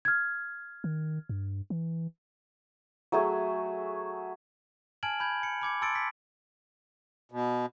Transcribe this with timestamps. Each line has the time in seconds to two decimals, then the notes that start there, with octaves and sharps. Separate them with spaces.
0.05 F6 G#6
0.84 D#3
1.29 G2
1.70 E3
3.12 F#3 A3 G#4
5.03 G#5 A5 F6 G#6 D7 F#7
5.20 B5 G6 G#6
5.43 C#7
5.61 B5 D6 G#6 C#7
5.82 A5 C6 E6 A6 C#7 D7
5.95 B6
7.32 B2